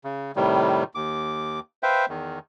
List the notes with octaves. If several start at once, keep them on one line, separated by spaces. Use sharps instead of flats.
C#3
A2 C3 D#3 G3
D#2 D6
B4 C5 E5 F5 G5
E2 D#3